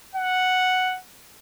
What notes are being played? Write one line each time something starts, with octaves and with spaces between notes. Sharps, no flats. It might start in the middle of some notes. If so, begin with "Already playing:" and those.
F#5